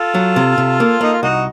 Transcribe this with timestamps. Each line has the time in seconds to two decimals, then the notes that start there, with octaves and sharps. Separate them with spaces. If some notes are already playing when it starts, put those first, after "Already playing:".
Already playing: F4 A4
0.15 F#3
0.36 C3
0.58 C3
0.80 A#3
1.01 A#3 D#4
1.13 F4
1.23 C2 D#4 F#4